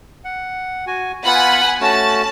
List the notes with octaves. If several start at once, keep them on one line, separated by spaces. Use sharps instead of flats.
F#5
F#4 G#5
B3 F4 F#5 G#5 B5
A3 C#4 F#4 A5